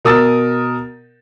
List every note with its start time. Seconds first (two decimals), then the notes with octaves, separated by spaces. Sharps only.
0.05 B2 A#4 D#6 E6 A6